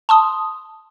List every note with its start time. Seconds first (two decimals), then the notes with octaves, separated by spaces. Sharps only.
0.09 A5 C6 D#6